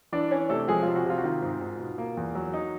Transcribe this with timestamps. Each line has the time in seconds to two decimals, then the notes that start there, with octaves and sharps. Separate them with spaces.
0.12 E3 D4 D5
0.31 C#4 C#5
0.49 C3 A3 A4
0.68 F3 G#3 G#4
0.83 C3 F4
0.96 F#4
1.06 C3 F4
1.18 F#4
1.24 D#3 F4
1.42 G#2
1.61 G#2
1.80 B2
1.98 A#3
2.17 E2
2.35 F#3
2.53 D#4